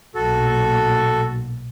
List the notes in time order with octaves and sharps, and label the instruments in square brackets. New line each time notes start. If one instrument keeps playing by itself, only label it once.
[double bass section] B1 A#2 [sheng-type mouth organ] F#4 A4